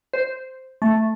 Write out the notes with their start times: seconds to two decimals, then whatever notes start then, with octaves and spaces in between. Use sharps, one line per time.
0.13 C5
0.82 A3